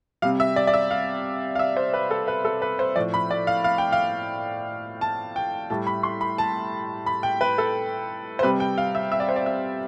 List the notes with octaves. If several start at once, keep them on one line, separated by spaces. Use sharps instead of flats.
C3 G3 F5
E5
D5
D5
E5
F5
F5
E5
C5
B4
A4
B4
A4
B4
C5
A2 F3 D5
B5
D5
F5
F5
G5
F5
A5
G5
A2 G3 A5
B5
C6
B5
A5
B5
G5
B4
A4
C5
C3 G3 B4
G5
F5
E5
E5
D5
C5
D5
E5